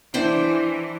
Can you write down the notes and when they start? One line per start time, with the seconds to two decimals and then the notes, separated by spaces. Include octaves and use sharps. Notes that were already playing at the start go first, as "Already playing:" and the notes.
0.14 E3 D4 C5 G5